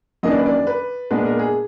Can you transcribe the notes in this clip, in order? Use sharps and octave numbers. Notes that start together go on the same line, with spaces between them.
F#2 D#3 A#3 D4 D#5
D5
B4
D5
B4
A#2 G#3 B3 D4 B4
A#4
G#4